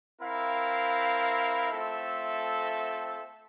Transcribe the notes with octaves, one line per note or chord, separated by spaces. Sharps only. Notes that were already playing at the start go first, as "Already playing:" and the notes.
C4 E4 A#4 F5
A3 C4 F4 A4 E5